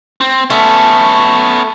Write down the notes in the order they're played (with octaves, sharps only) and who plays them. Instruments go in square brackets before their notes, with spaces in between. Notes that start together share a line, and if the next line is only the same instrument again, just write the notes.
[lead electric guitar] C4
[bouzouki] A3 [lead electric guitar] B3 C#4